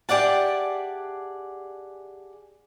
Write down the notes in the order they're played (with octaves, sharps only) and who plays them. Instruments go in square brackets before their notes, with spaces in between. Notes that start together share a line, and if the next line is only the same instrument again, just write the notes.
[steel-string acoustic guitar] G4 G#4 D5 E5 F#5 A5